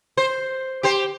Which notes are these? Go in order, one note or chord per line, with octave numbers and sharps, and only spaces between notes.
C5
G4 C5